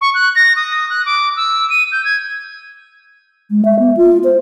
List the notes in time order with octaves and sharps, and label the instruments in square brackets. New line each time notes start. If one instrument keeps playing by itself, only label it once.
[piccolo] C#6
F#6
A#6
D#6
F#6
D6
E6
D#7
G6
G#6
[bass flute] G#3
E5
B3
F4
C5